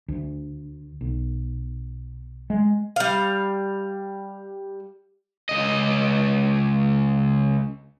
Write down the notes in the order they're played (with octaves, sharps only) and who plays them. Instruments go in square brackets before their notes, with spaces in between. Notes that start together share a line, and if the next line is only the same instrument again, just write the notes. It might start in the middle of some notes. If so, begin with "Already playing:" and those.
[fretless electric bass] D2
B1
G#3
[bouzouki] G3 F5
[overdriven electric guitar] C#2 D#5